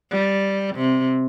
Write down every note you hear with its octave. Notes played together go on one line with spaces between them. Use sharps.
G3
C3